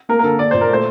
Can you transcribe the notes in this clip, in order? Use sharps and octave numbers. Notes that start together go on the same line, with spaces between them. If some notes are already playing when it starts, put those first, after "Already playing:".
A#3 A#4
A#4
D3 A4
A#3 D5
A#2 C5
A#4
A3 C5